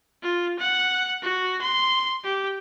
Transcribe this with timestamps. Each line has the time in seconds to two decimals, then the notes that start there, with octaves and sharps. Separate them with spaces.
0.23 F4
0.59 F#5
1.23 F#4
1.62 C6
2.24 G4